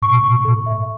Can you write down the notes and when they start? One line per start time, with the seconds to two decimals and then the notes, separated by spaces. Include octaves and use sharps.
0.02 A2 C#6
0.10 B2
0.19 A2
0.24 B2 C#6
0.37 A2
0.45 B2 A4
0.54 A2
0.66 E5